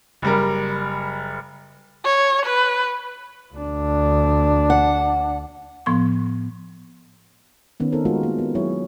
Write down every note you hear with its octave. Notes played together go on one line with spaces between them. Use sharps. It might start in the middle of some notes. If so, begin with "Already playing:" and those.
F#1 G3 A#4
C#5
B4
D2 D4
F#5
A2 F3 B3 C6 C#6
D#3 B3 C#4
B3 C4 D#4 A4 A#4 C5
G#3 A3 F4 F#4 A#4
A#3
B3
F#3 E4 G#4 C#5